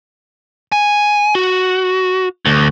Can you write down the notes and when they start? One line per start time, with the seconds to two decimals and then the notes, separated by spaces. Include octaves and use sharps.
0.72 G#5
1.35 F#4
2.45 D2